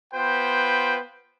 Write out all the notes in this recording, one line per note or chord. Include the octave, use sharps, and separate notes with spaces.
B3 F4 B4 C5 G5